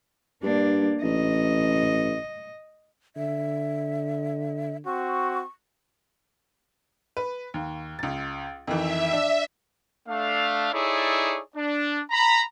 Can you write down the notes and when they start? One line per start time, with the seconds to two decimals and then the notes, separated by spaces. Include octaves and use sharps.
0.43 G2 A#3 D4
1.03 A1 D#5
3.16 D3 E5
4.85 C4 F#4 C#6
7.17 B4
7.54 D#2
7.99 C#2 A6
8.67 F2 D#3 E3 E5
9.13 D4
10.08 A3 D4 F5
10.72 D#4 E4 G#4 A4 C#5 D5
11.56 D4
12.10 A#5 B5